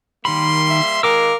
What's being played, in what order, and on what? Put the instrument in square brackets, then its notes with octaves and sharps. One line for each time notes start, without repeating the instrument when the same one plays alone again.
[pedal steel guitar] D#3 B5 [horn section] G3 A#3 C6
[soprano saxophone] E5
[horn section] D#3 G#3 [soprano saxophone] A#4 [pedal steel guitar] F5 D6 E6